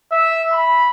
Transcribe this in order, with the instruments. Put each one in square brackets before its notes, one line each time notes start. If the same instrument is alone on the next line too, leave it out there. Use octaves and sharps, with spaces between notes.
[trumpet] E5
B5